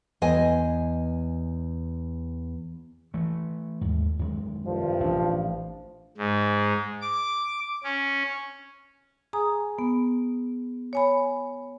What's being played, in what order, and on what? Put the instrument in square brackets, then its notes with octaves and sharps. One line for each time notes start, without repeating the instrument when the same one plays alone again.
[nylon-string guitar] E2 D#5 G#5
[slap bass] E3 A3
D#2 G#2
F#2 D#3 G#3
[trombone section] C2 G2 F3
[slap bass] A1 D4
[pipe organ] G#2
D6
C#4
[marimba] G#4 G#5 A#5 D#6
B3
C#5 G#5 B5